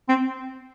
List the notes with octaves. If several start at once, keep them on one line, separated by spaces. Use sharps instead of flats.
C4